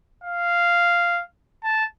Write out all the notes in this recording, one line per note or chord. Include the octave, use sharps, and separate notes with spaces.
F5
A5